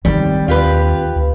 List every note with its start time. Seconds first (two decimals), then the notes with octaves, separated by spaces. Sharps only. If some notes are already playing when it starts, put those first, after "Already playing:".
0.05 D#3 G3 C4
0.48 D#2 F4 G4 B4
1.16 D2